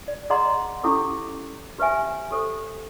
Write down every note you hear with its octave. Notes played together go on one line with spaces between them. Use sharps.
D5
G#4 D5 D#5 F#5 A#5 C6
C#4 E4 G4 A4 D6
G4 B4 C5 E5 G#5
G4 A4 C5